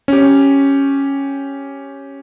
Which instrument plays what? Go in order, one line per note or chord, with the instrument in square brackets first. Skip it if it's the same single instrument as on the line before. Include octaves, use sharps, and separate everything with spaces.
[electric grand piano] C#4 G4